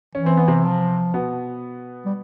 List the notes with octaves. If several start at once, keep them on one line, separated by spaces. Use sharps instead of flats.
E3 C#4
C4
B3
C3 C4
F3
B2 B3
G3